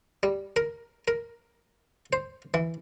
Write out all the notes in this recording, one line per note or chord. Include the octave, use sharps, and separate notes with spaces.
G3
A#4
A#4
C5
E3